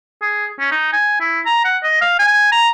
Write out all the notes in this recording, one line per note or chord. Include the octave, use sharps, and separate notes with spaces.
G#4
C#4
D#4
G#5
E4
A#5
F#5
D#5
F5
G#5
A#5